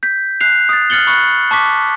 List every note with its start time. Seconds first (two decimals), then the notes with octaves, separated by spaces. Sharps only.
0.03 G6 B6
0.40 F#6 C7 F7
0.69 D#6 A6
0.90 F6 F#6 A6 C#7 F#7 G7
1.07 B5 C#6 F#6 C#7
1.51 A5 C#6 D6 B6